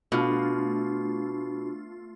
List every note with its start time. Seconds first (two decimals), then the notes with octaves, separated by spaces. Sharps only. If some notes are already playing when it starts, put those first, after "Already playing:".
0.12 B2 A3 D4 F4